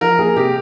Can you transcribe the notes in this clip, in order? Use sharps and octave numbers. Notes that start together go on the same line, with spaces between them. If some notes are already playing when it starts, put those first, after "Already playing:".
F3 A#4
A#3 G#4
C3 G4